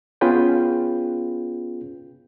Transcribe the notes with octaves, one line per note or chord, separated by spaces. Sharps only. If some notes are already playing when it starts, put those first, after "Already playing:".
B3 C#4 F4 G#4 B4 G5